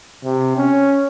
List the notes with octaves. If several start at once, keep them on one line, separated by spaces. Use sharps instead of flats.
C3
C#4